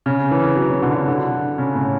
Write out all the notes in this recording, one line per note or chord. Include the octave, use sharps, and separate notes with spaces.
C#3
E3
F#3
F#3
D3
D3
D3
C#3
A2